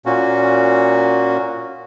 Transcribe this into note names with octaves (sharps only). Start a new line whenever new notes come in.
A#2 A#3 C#4 F#4